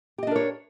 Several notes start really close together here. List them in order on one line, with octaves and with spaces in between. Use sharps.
G4 D#5 D4 A#4 C#5